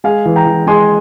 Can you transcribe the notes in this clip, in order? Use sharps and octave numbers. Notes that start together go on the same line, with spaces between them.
G#3 F5 G#5
E3
G5 A#5
E3
G#3 G#5 C6